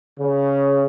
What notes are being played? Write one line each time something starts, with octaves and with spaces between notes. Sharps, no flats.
C#3